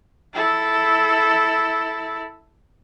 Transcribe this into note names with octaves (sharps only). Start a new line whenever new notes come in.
E4 A4